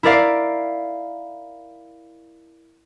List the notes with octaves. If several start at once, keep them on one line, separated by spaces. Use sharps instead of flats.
E4 A#4 D5 F5